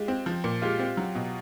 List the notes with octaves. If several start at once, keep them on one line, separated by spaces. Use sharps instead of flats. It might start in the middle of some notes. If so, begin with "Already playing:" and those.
Already playing: G#3 F4 G4
C4
F3
A#2
G#3 F4 G4
C4
F#3
B2